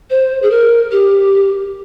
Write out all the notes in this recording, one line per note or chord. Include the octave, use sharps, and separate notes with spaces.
C5
G#4
A#4
G4